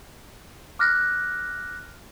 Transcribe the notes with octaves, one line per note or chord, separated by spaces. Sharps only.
D6 F6 F#6 A#6